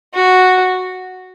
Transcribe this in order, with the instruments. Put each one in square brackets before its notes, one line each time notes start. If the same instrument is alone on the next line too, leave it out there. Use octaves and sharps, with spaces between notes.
[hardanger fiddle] F#4